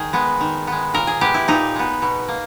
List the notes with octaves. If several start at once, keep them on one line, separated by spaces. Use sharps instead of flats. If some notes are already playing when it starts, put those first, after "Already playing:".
Already playing: D#3 G#4
G#3 B3
D#3
G#3 B3
A#2 A#4
G#4
G#3 B3 G4
E4
A#2 D#4
G#3 B3
B2
A#3